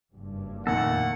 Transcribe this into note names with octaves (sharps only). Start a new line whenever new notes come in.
F#1 G2
F2 A#2 D#3 A3 A#3 A4 F#5